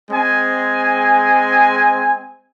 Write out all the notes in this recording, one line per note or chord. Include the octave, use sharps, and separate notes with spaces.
G#3 C4 G#5